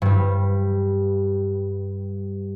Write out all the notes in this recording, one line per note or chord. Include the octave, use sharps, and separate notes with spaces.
G2 G3